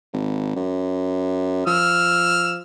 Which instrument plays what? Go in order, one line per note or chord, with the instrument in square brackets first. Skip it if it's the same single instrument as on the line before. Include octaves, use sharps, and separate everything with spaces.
[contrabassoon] G#1
F#2
[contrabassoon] F3 [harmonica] E6 F6